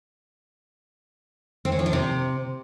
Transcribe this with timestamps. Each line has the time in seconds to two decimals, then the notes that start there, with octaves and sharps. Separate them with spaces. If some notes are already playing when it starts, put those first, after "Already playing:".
1.65 C4
1.72 C#4
1.79 F3
1.86 D4
1.93 C3